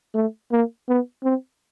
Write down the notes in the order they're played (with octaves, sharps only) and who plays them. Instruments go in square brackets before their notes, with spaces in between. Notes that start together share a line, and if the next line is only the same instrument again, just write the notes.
[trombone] A3
A#3
B3
C4